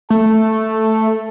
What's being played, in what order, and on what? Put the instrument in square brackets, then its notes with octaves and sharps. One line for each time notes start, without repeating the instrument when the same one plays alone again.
[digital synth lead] A3 [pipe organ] A4